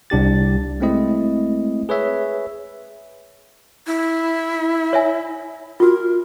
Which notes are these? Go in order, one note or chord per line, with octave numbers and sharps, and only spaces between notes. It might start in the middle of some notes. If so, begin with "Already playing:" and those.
C2 D4 G4 A6
G#3 A3 C4 E4 D#5
G#4 B4 C#5 E5
E4
C#5 E5 G#5
F4 F#4 A#4